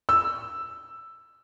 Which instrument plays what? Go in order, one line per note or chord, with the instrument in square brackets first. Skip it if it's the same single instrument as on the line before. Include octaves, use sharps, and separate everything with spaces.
[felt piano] E6